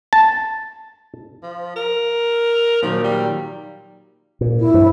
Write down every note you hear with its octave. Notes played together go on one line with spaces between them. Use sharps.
A5
F3
A#4
A#2 D#3 F3 F#3
G3
A#2
E4
G2 F3